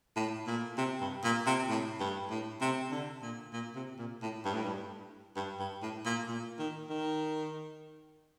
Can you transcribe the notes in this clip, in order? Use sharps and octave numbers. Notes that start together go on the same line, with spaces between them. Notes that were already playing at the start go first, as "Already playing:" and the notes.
A2
A#2
C3
G2
A#2
C3
A2
G2
A2
C3
D3
A#2
A#2
C3
A#2
A2
G2
A2
G2
G2
G2
A2
A#2
A#2
D#3
D#3